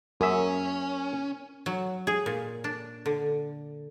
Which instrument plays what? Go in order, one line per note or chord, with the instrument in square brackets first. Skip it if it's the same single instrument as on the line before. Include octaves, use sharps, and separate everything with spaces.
[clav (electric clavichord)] F#2 G#4 E5 [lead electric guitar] C#4 [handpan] A#4
[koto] F#3
G#4
A#2
D4
D3